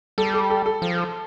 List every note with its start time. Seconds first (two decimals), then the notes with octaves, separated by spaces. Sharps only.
0.18 G3 A4
0.34 A4
0.50 A4
0.66 A4
0.82 F3